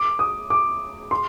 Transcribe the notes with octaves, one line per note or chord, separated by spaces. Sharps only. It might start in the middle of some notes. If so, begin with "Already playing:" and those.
Already playing: D6
D#6
D6
C6